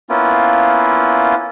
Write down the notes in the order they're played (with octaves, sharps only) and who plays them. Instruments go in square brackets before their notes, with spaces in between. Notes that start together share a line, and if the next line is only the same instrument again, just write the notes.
[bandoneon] A#3 B3 C#4 E4 F4